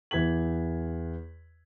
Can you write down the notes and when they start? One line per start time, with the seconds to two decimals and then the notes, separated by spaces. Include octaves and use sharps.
0.11 E2 E3 G#6 B6 F#7